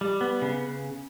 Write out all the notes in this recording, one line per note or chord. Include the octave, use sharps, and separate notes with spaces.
G3
B3
C#3